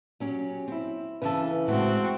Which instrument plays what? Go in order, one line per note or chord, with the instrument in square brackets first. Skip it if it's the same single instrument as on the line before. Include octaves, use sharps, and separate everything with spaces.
[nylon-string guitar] F#3 C#4 G4
C4 E4
[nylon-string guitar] C#3 E3 A4 [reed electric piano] B4 A5
[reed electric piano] A2 G#3 [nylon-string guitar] A3 [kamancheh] C4 F#4